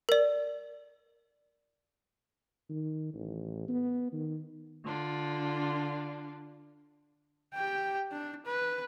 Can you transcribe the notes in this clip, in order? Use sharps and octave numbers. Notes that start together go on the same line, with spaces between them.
A#4 D5
D#3
A1
B3
D#3
D3 D4 F4
G4 G5
D4
B4